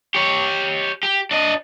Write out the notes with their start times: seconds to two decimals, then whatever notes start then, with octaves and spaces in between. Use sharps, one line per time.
0.15 G4 C#5
1.03 G4
1.31 D4 D#5